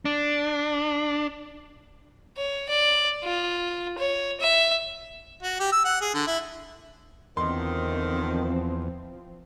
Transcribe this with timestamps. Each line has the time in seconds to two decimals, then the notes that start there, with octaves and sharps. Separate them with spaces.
0.05 D4
2.37 C#5
2.69 D5
3.24 F4
3.98 C#5
4.40 E5
5.43 F#4
5.60 G4
5.72 E6
5.85 F#5
6.01 G#4
6.14 D3
6.27 E4
7.37 E2 D3 D#3 F3 C4 C6